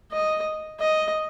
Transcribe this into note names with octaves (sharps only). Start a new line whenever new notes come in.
D#5
D#5